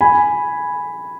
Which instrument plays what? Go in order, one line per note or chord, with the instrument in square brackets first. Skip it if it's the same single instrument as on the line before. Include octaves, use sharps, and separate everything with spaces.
[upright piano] G#5 B5